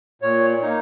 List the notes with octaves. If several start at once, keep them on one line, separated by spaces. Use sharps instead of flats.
A#2 C#5
A#3 D#4